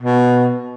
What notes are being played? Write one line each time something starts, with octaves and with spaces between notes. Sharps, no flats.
B2